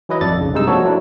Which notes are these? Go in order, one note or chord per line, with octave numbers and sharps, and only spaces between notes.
E3 F#3 E4 B4 D#5
G#1 F2 A4 D5 A6
B1 C#3
G2 C3 G#3 D#4 E6
F3 A#3 D4 F#4 A4 C#5
F#3 A3 D4 E4